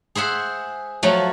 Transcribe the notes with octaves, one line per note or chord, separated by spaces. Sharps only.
G#4 C5 E5 F#5
F3 F#3 A3